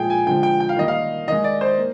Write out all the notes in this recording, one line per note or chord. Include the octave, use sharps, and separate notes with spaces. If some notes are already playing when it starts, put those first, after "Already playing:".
Already playing: A#2 F3 G#3 G#4 G5
G#5
D3 F3 G#3 G5
G5
G5
F5
D#3 G3 A#3 D#5
F5
D#3 G#3 D#5
D5
C5
A#3